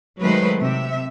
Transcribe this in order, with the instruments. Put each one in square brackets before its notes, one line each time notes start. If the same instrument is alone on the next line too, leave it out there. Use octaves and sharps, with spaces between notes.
[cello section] D#3 F#3 G#3 A3 B4 C5
C3 E5